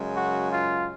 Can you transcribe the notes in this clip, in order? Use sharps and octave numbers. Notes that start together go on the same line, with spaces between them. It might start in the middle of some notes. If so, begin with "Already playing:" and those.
Already playing: F#2 C#3 G#3
F#4
F4